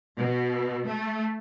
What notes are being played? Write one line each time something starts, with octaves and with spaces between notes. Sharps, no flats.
B2
A3